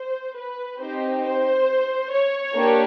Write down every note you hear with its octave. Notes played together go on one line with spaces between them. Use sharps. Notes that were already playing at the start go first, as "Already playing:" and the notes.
Already playing: C5
B4
C4 D#4 G4 C5
C5
C#5
A#3 D4 G4